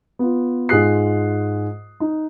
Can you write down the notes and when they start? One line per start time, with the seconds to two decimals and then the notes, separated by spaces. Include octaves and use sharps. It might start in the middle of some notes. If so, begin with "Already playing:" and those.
0.19 B3 F4
0.69 G#2 F4 G#4 D#6 F#6 C7
2.00 D#4